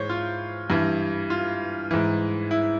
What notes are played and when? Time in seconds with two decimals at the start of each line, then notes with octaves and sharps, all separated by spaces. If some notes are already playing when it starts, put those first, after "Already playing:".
Already playing: G#2 E3 C5 C#5
0.09 F4
0.70 G2 E3
1.30 F4
1.91 G#2 E3
2.51 E4